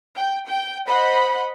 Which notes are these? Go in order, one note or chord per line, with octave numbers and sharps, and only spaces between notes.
G5
G5
C5 D#5 F#5 B5